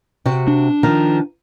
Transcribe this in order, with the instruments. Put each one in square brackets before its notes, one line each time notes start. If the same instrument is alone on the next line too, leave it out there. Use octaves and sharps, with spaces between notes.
[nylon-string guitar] C3 C4 F#4
[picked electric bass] D4
[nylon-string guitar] D#3 F3 A#4